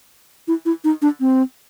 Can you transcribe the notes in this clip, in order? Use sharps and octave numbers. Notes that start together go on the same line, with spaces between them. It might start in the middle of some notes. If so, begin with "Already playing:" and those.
E4
E4
D#4
D4
C4